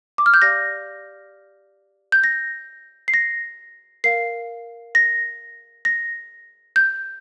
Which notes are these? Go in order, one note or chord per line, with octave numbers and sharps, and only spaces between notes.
D6
F6
G6
G4 D5 F5 A#6
G6
A#6
C7
A#6
A#4 F5 C7
A#6
A#6
G6